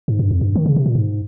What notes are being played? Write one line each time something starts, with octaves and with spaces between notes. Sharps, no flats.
G#2
G2
F2
G2
D#3
C#3
C3
A#2
G#2